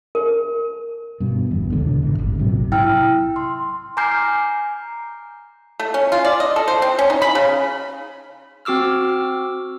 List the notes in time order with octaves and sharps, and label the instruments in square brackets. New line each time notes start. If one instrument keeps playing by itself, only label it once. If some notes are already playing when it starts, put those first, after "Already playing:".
[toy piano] A#4
[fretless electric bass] G2 B2
G1 E2
D#1 C#2 D3
G#1
D1 G1
A#1 G#2 C3 F#3
[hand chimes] E4 G5 E6 F6
C6
G#5 A#5 D6 F6 G6 C7
[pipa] A3
C#4
F4
D5
D#5
A4
C5
C4
C#4
D#4
B5
C#3
[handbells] C4 F#4 D6 E6 F6